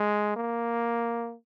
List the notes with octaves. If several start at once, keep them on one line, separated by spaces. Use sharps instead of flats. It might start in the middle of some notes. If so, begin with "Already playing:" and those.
Already playing: G#3
A#3